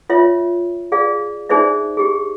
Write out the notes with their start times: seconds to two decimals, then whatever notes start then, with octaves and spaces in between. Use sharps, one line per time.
0.10 F4 C#5 E5
0.92 G#4 D5 F5
1.49 D4 D#4 G#4 C5 D5 E5
1.97 G4 G#4